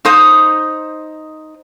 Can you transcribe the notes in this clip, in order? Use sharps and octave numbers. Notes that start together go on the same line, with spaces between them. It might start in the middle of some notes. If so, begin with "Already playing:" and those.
D#4 C5 D#6